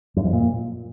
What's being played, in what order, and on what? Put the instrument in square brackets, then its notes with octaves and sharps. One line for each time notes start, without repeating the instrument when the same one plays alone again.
[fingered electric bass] F#2
F2
A#2